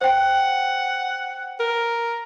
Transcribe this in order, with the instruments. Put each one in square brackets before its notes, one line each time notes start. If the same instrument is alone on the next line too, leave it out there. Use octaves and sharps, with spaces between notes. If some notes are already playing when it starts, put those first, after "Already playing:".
[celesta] C5 G5 [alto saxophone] F#5
[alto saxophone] A#4